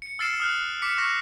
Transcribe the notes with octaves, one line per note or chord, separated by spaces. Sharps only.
C#7
E6 F6 A6 C7 D7 E7
D#6 F6 F#6
D6 B6 C#7
C#6 F#6 A#6